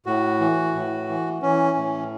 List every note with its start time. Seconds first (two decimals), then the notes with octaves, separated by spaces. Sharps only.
0.06 A2 F#4
0.40 E3
0.75 A2
1.09 E3
1.42 E3 C#4
1.77 A2